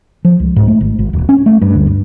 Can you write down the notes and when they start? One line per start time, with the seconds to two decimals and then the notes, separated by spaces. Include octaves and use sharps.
0.25 F3
0.40 C#2
0.56 G#2
0.68 A3
0.81 G#1
0.99 G#1
1.13 D#1
1.29 C#4
1.46 A3
1.62 G2
1.75 D2
1.87 G2